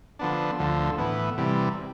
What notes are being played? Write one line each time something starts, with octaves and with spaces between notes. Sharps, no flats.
D3 F3 B3 D4
D2 D3 F3
A2 E3 B3
C3 E3 G3